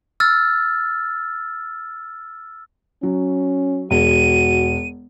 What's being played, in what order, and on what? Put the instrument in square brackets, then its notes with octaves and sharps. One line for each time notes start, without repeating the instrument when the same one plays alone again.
[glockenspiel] E6 F6 A6
[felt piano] F#3 [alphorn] C#4
[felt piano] E1 [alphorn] F#4 [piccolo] D#7